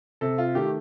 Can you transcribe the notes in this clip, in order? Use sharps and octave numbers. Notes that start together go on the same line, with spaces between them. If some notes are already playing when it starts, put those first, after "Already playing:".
C3 A4
F4
D#3 A3 G4